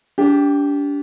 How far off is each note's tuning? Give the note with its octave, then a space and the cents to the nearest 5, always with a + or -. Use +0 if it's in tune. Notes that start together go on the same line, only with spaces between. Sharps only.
D4 -35 G4 +0